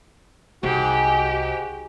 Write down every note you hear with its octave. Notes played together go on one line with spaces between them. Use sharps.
C2 G#2 F#4 G4